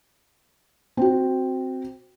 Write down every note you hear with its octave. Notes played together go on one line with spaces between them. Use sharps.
C4 F#4